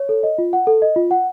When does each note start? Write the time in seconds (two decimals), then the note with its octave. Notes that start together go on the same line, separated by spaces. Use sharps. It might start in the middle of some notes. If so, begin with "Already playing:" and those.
Already playing: C#5
0.09 A4
0.23 D#5
0.38 F4
0.53 F#5
0.67 A4
0.82 D#5
0.96 F4
1.11 F#5